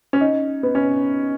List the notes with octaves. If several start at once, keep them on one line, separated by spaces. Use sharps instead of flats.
C#4
D#4
B3
C#4